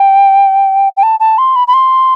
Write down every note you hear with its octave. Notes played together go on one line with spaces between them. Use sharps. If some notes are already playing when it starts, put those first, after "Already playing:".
Already playing: G5
G5
A5
A5
C6
B5
B5
C6